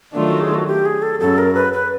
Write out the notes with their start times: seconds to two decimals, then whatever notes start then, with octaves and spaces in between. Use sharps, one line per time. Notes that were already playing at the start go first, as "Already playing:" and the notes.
0.14 D#3 F#3 A3 D4 F4
0.28 F#4
0.41 G#4
0.54 F#4
0.67 G4
0.86 G#4
1.02 A4
1.20 F#2 C#3 F#3 A4
1.38 A#4
1.55 B4
1.73 B4